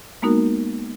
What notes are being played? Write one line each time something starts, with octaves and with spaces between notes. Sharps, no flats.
G#3 A#3 B3 D#4 F#4 A#4